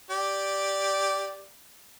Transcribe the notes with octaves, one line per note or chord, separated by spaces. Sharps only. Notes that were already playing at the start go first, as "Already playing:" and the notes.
G4 D5